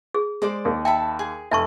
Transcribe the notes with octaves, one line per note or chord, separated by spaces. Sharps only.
G#4
G#3 C5 D5 D6
D#2
E5 G5 A5 B5
G#4
F1 E5 A5 C#6